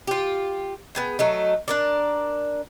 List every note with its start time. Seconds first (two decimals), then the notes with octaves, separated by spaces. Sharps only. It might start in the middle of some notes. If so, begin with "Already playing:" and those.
0.07 F4 G4
0.95 B3 G#4 G5
1.19 F#3 A3 D#4
1.68 D4 A#4 D5